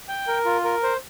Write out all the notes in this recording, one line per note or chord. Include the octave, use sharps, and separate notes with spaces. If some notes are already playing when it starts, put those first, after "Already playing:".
G5
A#4
F4
A#4
C5